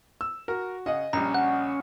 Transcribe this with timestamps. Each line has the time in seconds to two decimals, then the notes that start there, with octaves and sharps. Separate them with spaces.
0.21 E6
0.48 F#4 A#4
0.86 C#3 D#5 F#5
1.13 A#1 G3 C#4 A#5
1.34 F#5